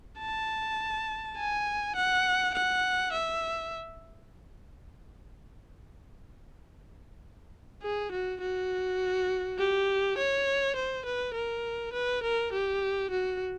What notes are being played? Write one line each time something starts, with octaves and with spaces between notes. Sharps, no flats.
A5
G#5
F#5
F#5
E5
G#4
F#4
F#4
G4
C#5
C5
B4
A#4
B4
A#4
G4
F#4